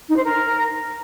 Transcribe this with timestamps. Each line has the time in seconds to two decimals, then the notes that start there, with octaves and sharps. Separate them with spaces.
0.09 D#4
0.16 C5
0.24 A#4